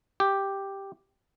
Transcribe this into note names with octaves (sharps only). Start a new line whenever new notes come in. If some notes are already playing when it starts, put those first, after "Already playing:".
G4